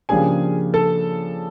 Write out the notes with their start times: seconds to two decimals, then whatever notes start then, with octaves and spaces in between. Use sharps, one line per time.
0.09 C#3 F3 A#3 D4 G4 G#4 G#5
0.74 A4 A5